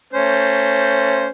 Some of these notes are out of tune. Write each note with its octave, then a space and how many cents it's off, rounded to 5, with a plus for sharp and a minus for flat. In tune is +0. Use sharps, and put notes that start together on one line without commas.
A3 +25 C#4 +0 C5 +0